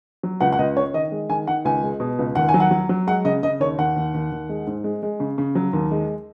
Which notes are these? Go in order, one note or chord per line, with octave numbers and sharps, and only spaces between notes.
F#3
C#2 F#5
F#5
C#2 D#5
C#3 C#5
D#3 D#5
G#3
D#3 G#5
D#3 F#5
C#2 G#5
G#3
B2
C#2
D#2 F#5
G#5
F#3
F#5
F#3
F#3
G#3 F#5
C#3 D#5
C#3 D#5
D#2 C#5
D#2 F#5
D#2
D#2
D#2
G#3
G#2
G#3
G#3
C#3
C#3
F#3
D#2
G#3